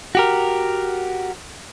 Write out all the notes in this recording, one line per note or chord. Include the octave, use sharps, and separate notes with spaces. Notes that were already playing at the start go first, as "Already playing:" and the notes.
F#4 G4 A#4